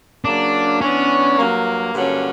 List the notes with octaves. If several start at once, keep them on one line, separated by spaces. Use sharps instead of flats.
C#3 F#3 A#3 D4
E3 B3 C#4 D4
G2 F#3 A#3
G2 D3 F#3 A#3 C#4